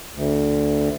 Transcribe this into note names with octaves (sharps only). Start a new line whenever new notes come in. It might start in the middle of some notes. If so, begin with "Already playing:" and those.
D2